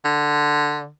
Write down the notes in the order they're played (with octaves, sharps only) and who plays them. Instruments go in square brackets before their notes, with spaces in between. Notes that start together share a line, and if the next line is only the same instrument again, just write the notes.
[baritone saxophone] D3